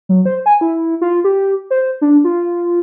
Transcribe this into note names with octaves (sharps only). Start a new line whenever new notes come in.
F#3
C5
G#5
E4
F4
G4
C5
D4
F4